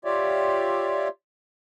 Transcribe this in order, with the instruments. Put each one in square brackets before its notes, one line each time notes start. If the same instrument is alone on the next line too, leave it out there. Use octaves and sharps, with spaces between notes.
[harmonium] F4 G4 C#5 D5 E5